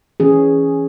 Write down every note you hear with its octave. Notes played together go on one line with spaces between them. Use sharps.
E3 C#4 G#4